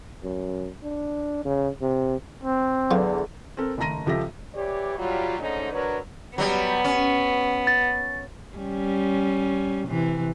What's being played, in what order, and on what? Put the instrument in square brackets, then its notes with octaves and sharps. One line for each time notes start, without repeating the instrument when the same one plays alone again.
[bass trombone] F#2
D4
C#3
C3
[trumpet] C4
[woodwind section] E2 D3 [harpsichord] F#3 F4
[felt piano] C4 A4 A#4
F#1 D#2 A3 A#5 A#6 D#7
C#2 F3 G4 A4 E5 A#6
[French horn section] E3 G4 C#5 D5
F#3 G3 F4
G#2 D3 A3 C#4 D#4
F#3 D4 A#4 B4 C#5
[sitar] F#3 G3 [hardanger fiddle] B3
[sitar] C#4
[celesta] A6
[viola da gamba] G3 C#4
C3 E3